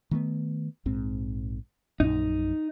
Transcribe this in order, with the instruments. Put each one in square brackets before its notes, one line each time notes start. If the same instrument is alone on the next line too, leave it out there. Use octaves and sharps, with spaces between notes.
[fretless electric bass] D#3 A3 B3
A#1 G#2 C4
[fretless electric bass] A#1 F#2 A#2 [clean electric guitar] D#4